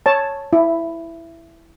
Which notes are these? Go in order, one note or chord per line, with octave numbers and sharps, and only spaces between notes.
C#5 A5
E4